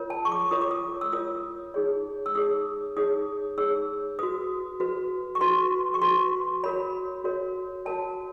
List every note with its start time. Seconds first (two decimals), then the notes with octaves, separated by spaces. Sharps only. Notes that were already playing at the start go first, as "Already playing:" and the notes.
Already playing: F4 A#4 C#5
0.10 A5
0.25 C#6
0.32 D6
0.51 F4 A#4 C#5 D#6
0.61 D6
0.71 D#6
1.01 E6
1.12 F4 A#4 C#5 D#6
1.74 D#4 G#4 C#5
2.26 E6
2.35 D#4 G#4 C#5 D#6
2.97 D#4 G#4 C#5 D#6
3.57 D#4 G#4 C#5 E6
4.19 F#4 B4 D#6
4.80 F#4 B4
5.35 C#6
5.41 F#4 B4 C6
5.94 C#6
6.02 F#4 B4 C6
6.63 F#4 A#4 C#5 B5
7.24 F#4 A#4 C#5
7.85 F#4 A#4 C#5 A5